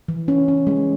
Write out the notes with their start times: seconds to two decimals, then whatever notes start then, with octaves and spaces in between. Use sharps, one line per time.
0.08 E3
0.28 C#4
0.48 C#4
0.67 G#3